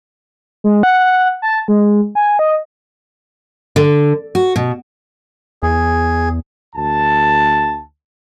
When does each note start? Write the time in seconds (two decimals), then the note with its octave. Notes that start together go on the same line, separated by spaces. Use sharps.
0.64 G#3
0.83 F#5
1.03 F#5
1.42 A5
1.68 G#3
2.15 G#5
2.39 D#5
3.76 D3
4.35 F#4
4.56 B2
5.63 E2 G#4
6.74 D2 A5